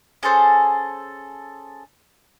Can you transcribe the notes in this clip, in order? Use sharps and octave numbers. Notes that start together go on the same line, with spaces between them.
C#4 G#4 A4 C5